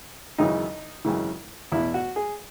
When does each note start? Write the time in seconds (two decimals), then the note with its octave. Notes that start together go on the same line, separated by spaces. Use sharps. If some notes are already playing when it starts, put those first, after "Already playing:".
0.38 G#1 F#2 C#3 E3 D#4
1.05 G#1 F#2 C#3 E3
1.72 E2 B2 E4
1.94 F#4
2.16 G#4